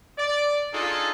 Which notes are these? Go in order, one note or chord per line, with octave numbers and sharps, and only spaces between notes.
D5
D4 D#4 F4 G#4 A4